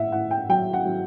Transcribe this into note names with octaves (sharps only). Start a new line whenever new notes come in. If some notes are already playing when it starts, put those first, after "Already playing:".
Already playing: A2 E5 F#5
A2 F#5
G5
F#3 G5
F#5
F#3